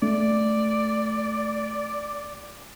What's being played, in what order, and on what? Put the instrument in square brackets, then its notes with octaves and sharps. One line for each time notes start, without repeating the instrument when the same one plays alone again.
[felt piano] A3 [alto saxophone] D5